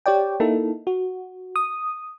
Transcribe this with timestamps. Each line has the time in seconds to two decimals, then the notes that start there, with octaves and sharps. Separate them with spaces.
0.06 G4 C#5 D5 G5
0.40 A#3 D#4 E4 A4
0.87 F#4
1.56 D#6